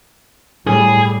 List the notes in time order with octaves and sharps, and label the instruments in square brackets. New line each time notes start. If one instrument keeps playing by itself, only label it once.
[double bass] A2 G3 [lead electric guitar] G#4